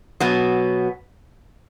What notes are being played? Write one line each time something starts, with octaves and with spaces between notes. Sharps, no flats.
B2 F#3 B3